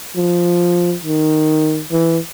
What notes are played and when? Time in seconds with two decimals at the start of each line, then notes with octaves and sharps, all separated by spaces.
0.16 F3
1.04 D#3
1.92 E3